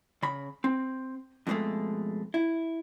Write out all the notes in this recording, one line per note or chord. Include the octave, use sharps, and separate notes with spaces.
C#3 B5
C4
F2 B2 D3 G#3 A3
E4